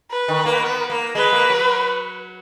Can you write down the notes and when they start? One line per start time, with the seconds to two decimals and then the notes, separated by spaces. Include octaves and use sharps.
0.11 B4
0.28 D#3
0.46 A#3
0.63 B3
0.90 A#3
1.15 G#3 B4
1.33 A#3
1.50 F#3